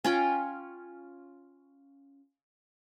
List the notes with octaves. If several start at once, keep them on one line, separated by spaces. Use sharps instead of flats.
C#4 F4 G5